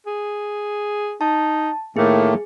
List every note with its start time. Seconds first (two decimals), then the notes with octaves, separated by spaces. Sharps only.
0.06 G#4
1.21 D#4 A5
1.97 A2 D#3 A3 A#3 G#4